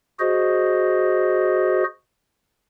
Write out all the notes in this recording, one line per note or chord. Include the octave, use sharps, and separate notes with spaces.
F#4 G#4 C5 D#5